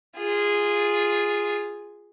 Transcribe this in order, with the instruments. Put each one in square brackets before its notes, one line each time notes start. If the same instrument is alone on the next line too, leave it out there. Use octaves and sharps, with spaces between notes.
[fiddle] F4 G#4